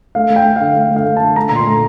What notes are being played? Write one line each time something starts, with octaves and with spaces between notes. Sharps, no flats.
A3 F5
A3
G5
A3
D3 F5
A3 F5
A3
F5
A3
A5
D3
A3 A#5
A#2 A#5
C6
A3